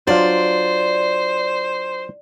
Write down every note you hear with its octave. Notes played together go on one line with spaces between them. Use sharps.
F#3 D4 F4 C5 D5